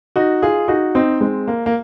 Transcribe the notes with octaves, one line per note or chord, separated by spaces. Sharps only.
D#4 F#4
F4 G#4
D#4 F#4
C4 D#4
G#3 C4
A#3
A#3